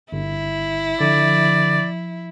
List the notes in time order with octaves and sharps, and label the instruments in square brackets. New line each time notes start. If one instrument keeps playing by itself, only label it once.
[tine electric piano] G1 [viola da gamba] E4
[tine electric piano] D3 [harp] F3 [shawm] D5